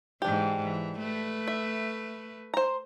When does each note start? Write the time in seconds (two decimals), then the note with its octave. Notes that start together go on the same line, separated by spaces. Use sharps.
0.22 G#2 E3 D4 G4
0.63 E3
0.98 A3 B4
1.48 E5
2.54 C5 A#5